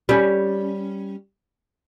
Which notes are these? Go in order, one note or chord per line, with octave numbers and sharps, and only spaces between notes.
G3 C#4